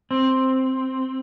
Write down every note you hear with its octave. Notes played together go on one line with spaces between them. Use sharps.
C4